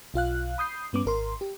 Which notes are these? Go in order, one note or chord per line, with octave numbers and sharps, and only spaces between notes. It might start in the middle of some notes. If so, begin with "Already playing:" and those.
B1 F4 F5 F#6
B5 D#6 G6 C7
G2 B3 C#4 D6
G#1 A#4 C6
G4